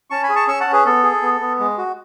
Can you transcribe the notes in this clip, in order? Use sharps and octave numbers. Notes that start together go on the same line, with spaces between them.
C#4 A5 C#6
G#5 B5
G#4
A5 C#6
C#4 C#6 E6
F#5 A5
C#4
G#4 B4
B3 A4
G#4
B3
B3
G#3
F#4